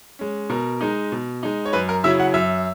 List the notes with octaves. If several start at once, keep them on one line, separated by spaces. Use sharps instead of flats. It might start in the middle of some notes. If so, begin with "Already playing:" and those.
G#3 C#4
B2 A#4
G#3 D#4
B2
G#3 D#4
C#5
F#2 B4
A#4
C#3 F#3 C#4 E4 E5
F#5
F#2 E5